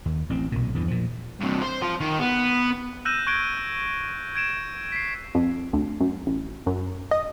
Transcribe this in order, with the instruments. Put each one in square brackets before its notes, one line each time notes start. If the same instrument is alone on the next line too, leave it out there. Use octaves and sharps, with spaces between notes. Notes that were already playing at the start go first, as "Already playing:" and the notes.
[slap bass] D#2
A1 C4
B1 A#2
E2 G2 E3
A#2 F3
[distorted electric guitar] G2 C3
C5
F3 C5
D#3
B3
[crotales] E6 F#6 G6 A#6 D#7 E7
C#6 F#6 G#6 A#6 D7 G7
G#6 D7 E7
B6 C7
[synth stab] F2
D2
F#2
A1
F#2
D#5